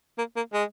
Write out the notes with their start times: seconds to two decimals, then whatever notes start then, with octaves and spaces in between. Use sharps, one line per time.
0.18 A#3
0.36 A#3
0.53 G#3